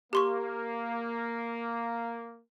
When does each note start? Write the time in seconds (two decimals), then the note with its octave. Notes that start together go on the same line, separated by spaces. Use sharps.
0.13 A#3 G4 C6 C#6